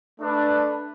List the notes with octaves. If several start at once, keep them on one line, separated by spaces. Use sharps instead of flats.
A3 D4 B4